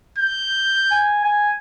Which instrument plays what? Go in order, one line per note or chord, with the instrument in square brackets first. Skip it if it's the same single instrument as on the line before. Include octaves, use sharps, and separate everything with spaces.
[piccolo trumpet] G6
[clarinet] G#5
G#5